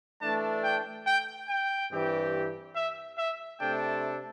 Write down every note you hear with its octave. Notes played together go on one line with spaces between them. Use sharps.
E3 A3 D4 A5
G5
G5
G5
G2 E3 C4 G4
E5
E5
C3 A3 D4 A4 G5